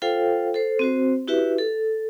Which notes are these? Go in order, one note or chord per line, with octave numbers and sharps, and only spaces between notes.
F4 A4 C5 F5 G5
A4 C5
C4 F#4 C5
E4 F#4 G4 B4 E5
A4